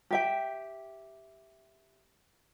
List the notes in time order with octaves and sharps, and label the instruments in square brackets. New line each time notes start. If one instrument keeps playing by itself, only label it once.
[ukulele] G4 E5 G5